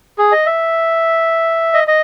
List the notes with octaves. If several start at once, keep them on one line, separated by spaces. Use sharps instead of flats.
G#4
D#5
E5
D#5
D#5